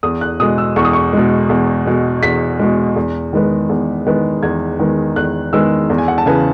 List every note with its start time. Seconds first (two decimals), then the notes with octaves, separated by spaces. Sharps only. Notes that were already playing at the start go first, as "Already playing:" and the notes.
0.03 E2 D#6
0.21 F#6
0.40 B2 G#3 D#6
0.58 E6
0.76 E2 C#6
0.85 D#6
0.93 C#6
1.13 B2 G#3
1.50 E2
1.87 B2 G#3
2.23 E2 B6
2.60 B2 G#3
2.96 E2
3.33 D#3 G#3 B3
3.69 E2
4.07 D#3 G#3 B3
4.43 E2 G#6
4.79 D#3 G#3 B3
5.16 E2 F#6
5.53 D#3 G#3 B3 E6
5.90 E2
5.98 G#5
6.08 F#5
6.18 A5
6.26 C#3 E3 B3 G#5